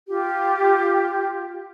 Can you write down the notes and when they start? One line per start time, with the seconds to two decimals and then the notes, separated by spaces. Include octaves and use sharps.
0.08 F4 G4